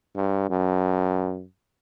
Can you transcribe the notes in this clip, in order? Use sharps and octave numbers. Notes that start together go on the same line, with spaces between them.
G2
F#2